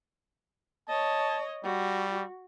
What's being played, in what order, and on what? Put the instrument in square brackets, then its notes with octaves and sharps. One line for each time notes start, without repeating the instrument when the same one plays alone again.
[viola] C#5 D#5 [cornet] A5
[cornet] G3 [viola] F#4